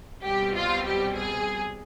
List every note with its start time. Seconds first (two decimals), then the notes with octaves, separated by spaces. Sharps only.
0.22 C2 B2 G3 C4 G4
0.55 F4
0.85 G4
1.16 G#4